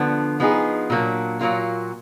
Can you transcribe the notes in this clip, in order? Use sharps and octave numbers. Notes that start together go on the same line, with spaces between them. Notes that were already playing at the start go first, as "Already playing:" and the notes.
Already playing: D3 F3 B3
F3 B3 D#4 G#4
A#2 F#3 A#3 D4
A#2 F#3 A#3 F4